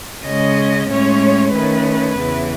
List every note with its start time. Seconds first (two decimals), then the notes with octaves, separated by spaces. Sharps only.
0.24 C#3 G#3 C#4 D#5
0.88 A2 G#3 C#4 C#5
1.52 D#3 A3 C#4 B4
2.17 E2 C#3 E3